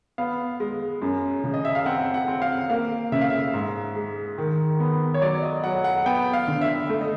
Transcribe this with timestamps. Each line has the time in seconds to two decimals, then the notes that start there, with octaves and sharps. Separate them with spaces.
0.18 B3 F5
0.60 G#3
1.02 F#2
1.44 C#3
1.54 D#5
1.65 E5
1.75 F5
1.86 C4 F#5
2.14 F#5
2.28 C4
2.42 F5
2.70 A#3 F5
3.12 C#3 E5
3.21 F5
3.30 E5
3.54 G#2
3.96 G#3
4.38 D#3
4.80 B3
5.14 C#5
5.22 F#3 D5
5.43 D#5
5.64 F#3 F#5
5.84 F#5
6.06 B3 G5
6.33 F5
6.48 D3
6.61 E5
6.90 A3
7.01 D#5